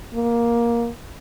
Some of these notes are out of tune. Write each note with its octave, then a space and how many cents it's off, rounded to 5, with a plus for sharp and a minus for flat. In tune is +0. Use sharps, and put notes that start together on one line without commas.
A#3 +10